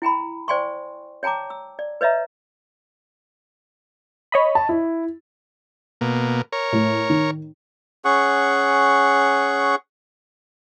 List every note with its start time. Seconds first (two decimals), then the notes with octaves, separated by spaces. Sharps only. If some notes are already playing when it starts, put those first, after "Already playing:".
0.02 E4 G5 A#5 B5
0.48 C5 D5 G5 G#5 C6 C#6
1.23 C#5 G5 A5 A#5 D6
1.50 E6
1.79 D5
2.01 B4 C#5 D#5 E5 A#5
4.32 C#5 D#5 B5
4.55 A5
4.69 E4
6.01 B2 A#3
6.52 A#4 C#5
6.72 A2
7.10 D#3
8.05 C#4 G#4 F#5 C#6